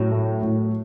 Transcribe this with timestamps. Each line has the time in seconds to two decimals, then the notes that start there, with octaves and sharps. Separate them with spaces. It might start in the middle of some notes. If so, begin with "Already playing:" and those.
Already playing: F#2 A2 F#3
0.12 A3
0.42 A2